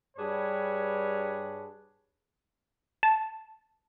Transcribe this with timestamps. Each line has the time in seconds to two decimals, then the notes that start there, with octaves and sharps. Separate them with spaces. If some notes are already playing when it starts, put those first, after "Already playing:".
0.17 G2 G3 D4 G#4 B4 C#5
3.03 A5